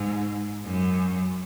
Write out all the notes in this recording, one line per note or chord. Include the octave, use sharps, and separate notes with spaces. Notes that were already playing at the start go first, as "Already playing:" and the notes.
Already playing: G#2
F#2